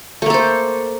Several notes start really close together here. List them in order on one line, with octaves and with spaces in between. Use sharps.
A3 A#3 A4 C5